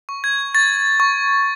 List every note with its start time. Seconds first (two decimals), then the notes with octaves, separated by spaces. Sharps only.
0.09 C#6
0.24 G#6
0.55 C#6 A6
1.00 C#6